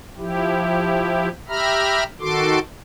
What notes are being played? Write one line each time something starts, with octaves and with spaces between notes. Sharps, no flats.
F3 E4 G4
G4 E5 A#5 B5 F6
D#3 F#4 A4 C6 D6